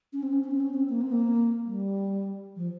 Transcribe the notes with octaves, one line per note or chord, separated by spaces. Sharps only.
C#4
C4
C#4
C#4
C4
C#4
C4
A#3
C4
A#3
G3
F3